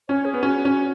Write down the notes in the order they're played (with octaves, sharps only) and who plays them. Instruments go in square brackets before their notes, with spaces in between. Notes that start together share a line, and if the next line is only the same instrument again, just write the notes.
[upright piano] C#4 [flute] C#5
[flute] G#4
[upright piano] B3
[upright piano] C#4 [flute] F#4
[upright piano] C#4